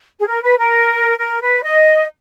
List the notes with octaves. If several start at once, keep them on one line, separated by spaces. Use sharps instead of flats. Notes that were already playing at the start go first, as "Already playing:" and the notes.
G#4
A#4
B4
A#4
A#4
B4
D#5